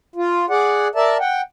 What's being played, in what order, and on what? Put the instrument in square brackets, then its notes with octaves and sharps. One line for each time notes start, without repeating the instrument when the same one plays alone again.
[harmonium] F4
G#4 D5 F#5
A#4 D5 E5 A5
F#5 G5